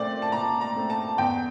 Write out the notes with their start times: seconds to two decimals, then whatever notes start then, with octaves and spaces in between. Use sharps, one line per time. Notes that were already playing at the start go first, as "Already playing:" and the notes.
Already playing: A#2 A3 C4 D5
0.22 A5
0.32 A#2 A#5
0.61 A#5
0.76 A3 C4
0.90 A5
1.18 E2 G5